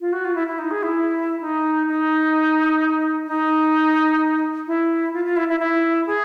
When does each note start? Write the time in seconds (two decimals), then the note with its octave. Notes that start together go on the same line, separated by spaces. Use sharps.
0.01 F4
0.13 F#4
0.25 F4
0.35 E4
0.47 E4
0.59 D#4
0.71 G#4
0.83 E4
1.41 D#4
1.88 D#4
3.27 D#4
4.67 E4
5.14 F4
5.25 F4
5.37 E4
5.49 E4
5.60 E4
6.07 G#4